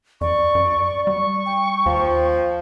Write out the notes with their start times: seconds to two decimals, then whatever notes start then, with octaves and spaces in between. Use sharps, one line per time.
0.21 F2 D5 C#6
0.55 F#2
1.07 G3 C#6
1.46 G5
1.86 D#2 F3